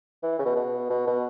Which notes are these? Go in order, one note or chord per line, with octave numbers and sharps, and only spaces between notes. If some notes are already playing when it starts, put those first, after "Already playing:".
E3
C#3
B2
B2
B2
B2